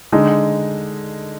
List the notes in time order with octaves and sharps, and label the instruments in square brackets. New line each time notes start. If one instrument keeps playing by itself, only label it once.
[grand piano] D3 G#3 D#4